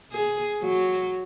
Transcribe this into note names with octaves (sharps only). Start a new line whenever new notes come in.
G#4
F#3